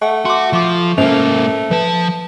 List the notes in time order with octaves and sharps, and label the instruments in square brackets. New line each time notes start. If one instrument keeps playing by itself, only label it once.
[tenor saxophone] A3 [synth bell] F#5 C#6
[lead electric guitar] F#4 [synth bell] C6 D6
[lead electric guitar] F3 [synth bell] C#6 D6
[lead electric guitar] G#2 A#3 [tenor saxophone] A3 [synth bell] C#4 C5 F7
[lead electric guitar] F3 A5 [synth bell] B4